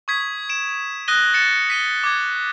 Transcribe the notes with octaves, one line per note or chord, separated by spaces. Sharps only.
C#6 D#6 G#6 B6
D7 E7
D#6 F#6 A#6 D#7 G7
A6 C#7 E7
B6 D#7 G7
D6 G#6